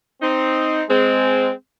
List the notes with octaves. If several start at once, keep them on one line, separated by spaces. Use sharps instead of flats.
C4 D#4
G#3 C4